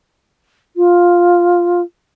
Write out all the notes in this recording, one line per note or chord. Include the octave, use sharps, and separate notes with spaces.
F4